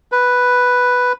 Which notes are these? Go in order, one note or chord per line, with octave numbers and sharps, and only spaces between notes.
B4